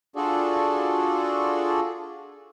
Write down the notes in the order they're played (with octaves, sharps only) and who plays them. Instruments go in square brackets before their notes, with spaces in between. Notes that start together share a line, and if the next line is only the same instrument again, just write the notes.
[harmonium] D4 F4 F#4 G#4 A4 D5